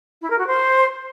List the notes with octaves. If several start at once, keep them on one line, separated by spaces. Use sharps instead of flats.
E4
A#4
F#4
C5